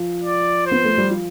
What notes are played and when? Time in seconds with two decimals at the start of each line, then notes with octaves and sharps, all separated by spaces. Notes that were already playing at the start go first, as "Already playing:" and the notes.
Already playing: F3
0.23 D5
0.66 C5
0.71 B3
0.84 A3
0.98 G3
1.10 F3